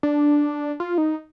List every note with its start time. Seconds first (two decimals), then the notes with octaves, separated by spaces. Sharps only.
0.03 D4
0.80 F4
0.98 D#4